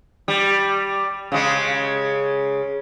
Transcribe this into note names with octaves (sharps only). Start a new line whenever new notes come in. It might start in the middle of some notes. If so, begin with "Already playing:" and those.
G3
C#3 G#3